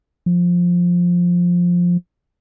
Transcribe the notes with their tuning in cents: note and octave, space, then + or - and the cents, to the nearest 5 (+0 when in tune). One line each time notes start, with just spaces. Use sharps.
F3 +10